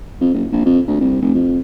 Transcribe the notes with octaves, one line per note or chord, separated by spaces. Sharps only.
F2
F#1
A#1
F2
D2
C2
F1
F2